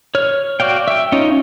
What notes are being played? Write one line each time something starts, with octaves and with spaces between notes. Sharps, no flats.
C#5 F6
F#4 D5 F5 G5
E5 G5
C#4 D#4 F4 D#5